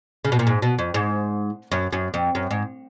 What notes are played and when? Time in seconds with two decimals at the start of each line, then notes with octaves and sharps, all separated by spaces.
0.25 C#3
0.32 B2
0.39 A#2
0.47 G#2
0.62 B2
0.79 F2
0.94 G#2
1.72 F#2
1.93 F#2
2.14 F2
2.35 F#2
2.51 G#2